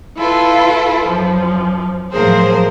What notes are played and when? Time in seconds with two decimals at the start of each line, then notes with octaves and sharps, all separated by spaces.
0.16 E4 F4 A4 B4
1.06 F#2 F3
2.11 A2 F3 F#3 G#4 A#4 C5